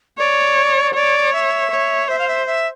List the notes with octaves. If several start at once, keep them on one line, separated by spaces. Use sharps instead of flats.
C#5 D5
C#5 D5
E5
C#5
C5 E5
F5
E5
E5